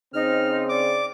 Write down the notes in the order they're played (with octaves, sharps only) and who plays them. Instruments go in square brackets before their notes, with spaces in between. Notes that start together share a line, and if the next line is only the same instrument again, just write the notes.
[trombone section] C#3 C4 [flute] D#4 [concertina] F6
[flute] D5 [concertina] D6